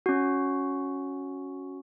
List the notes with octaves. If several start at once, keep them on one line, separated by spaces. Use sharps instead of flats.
C#4 F#4